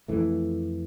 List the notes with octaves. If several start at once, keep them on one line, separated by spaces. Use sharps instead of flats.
F2 E3 A3